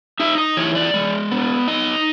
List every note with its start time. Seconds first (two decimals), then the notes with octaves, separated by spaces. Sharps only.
0.20 D#4 E5
0.38 D#5
0.57 E3 C#5
0.75 D5
0.94 G#3
1.31 B3
1.68 D#4 D#5